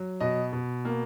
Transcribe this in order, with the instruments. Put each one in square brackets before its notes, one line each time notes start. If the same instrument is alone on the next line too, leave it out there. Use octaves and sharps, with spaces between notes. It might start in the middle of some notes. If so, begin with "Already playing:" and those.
Already playing: [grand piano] F#3
B2 D#5
B2
A#3